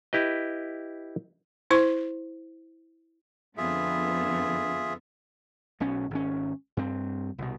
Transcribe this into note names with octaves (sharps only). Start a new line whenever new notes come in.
E4 G4 B4 D#5
E4 C5 C#6
F2 D3 B3 F4 G#4 E5
B1 B2 C#4
G#1 C#4
G2 C4
C2 B2